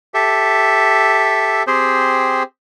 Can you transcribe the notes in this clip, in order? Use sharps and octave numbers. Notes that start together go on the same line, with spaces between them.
G4 A4 E5
C4 G4 G#4 C5